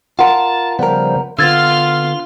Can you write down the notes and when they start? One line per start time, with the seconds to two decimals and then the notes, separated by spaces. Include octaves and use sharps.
0.19 F4 A#4 F#5 A5 C6
0.79 C#3 F3 G3 B3 A#4
1.39 D3 B3 F4 C6 E6 F6 G#6 A6